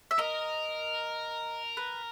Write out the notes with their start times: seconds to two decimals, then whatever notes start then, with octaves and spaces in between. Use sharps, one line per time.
0.11 E5
0.19 A#4 D#5
1.77 B4